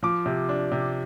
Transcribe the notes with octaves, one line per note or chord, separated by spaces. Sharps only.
F3 D6
C3
D4
C3